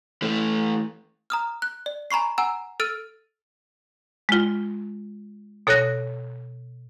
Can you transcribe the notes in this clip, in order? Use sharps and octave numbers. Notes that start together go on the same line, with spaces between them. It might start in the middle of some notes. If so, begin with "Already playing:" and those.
E3 A3
A#5 D#6 F6
F#6
D5
G#5 A#5 B5 C#6 C7
F#5 G#5 A#5 E6
A4 E6 F6 A6 D7 D#7
G#3 F4
B2 A4 C#5 F#6 A#6